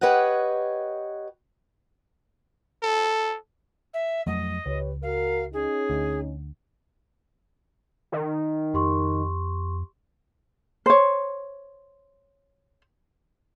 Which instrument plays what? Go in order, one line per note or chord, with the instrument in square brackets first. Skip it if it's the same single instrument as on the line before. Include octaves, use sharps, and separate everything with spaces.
[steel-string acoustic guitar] G4 B4 C#5 D#5 F#5
[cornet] A4
[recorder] E5
[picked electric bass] F2 F#3 A3 [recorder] D#5
[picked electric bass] C#2 [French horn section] G4 B4 C#5
[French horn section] F#4 A#4 [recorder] F5
[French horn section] C#4 D#4 [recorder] G#4
[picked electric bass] D2
[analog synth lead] D#3
[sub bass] F2 [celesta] G4 C6 C#6
[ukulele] C5 C#5